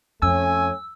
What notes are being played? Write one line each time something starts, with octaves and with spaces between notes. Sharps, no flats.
F2 A3 C#4 G#5 E6